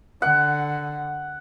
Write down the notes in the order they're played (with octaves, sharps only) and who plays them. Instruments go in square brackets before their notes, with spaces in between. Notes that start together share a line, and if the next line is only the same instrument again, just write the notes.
[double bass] D3 [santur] F#5